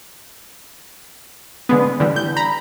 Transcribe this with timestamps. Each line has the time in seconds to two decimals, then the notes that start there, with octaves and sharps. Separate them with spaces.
1.69 D3 G#3 B3
2.00 D3 E3 G3
2.16 G6
2.37 A#5 B5